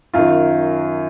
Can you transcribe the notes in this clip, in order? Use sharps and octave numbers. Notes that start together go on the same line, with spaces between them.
F#2 D#3 F4